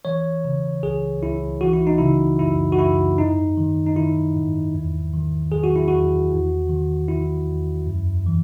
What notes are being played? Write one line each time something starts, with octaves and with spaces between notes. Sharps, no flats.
E3 C#5
C#3
C#2 G#4
C#2 E4
E3 F#4
E4
D#4
C#3 E4
F#2 E4
F#4
F#2 E4
G#2 D#4
D#3
D#4
D#3 E4
G#2
E2
D#3
D#3 G#4
F#4
E4
E2 F#4
E2
D#3
D#3 E4
E2
F#2
E3